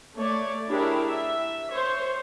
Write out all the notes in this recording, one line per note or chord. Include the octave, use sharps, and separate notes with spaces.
A3 C#5 D5
D4 E4 G4 G#4 A#4 C#5
E5
C5 C#5